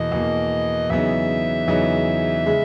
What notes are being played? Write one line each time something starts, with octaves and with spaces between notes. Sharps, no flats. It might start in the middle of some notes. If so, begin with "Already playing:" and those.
Already playing: E2 B2 A#3 D#5
E2 B2 A#3
E2 C#3 F#3 B3 D#4 E5
E2 C#3 F#3 B3 D#4
C#3 G#3